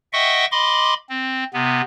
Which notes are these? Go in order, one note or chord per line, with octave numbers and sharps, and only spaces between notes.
D#5 E5 F#5 G5 C#6
D#5 B5 C6 D6
C4
C3 B3